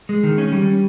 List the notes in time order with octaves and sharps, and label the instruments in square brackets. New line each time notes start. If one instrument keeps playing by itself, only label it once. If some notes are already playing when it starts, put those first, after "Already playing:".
[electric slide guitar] G#3
D#3
C#4
G3